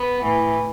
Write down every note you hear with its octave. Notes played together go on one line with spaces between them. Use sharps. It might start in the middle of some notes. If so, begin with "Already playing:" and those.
Already playing: B3
A2 E3